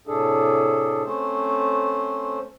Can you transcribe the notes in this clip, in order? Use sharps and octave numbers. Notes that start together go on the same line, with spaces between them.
A2 C3 D4 G#4 A4
A3 C4 C#4 C5